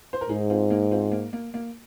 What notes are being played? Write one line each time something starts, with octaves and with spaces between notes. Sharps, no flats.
C5
A#4
G#2 D#4 G#4
C4 F4
A#3 D#4
C4 F4
A#3
A#3
A#3